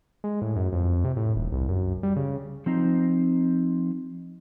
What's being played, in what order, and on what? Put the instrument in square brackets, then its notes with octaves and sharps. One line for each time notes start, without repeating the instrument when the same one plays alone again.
[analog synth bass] G#3
A2
F#2
F2
C3
A2
D#1
C2
F#2
G3
C#3
[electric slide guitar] F3 C4 D#4